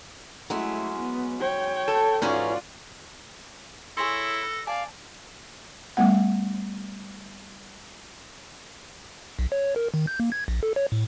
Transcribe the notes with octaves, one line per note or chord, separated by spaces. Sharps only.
F#3 G#3 A3 C#4 E4
B3
C#5 G5
A4
G#2 E3 C#4 D#4 F4 F#4 C#5 D5
E4 G#4 A4 C#5 C6 A#6
B4
D5 F5 G#5 A5
G3 A3 B3 F#5
B1
C#5
A#4
D#3
G6
A#3
G#6
A#1
A4
C#5
A2